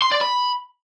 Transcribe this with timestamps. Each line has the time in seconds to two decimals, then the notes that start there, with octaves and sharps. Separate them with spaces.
0.02 C6
0.12 D5
0.21 B5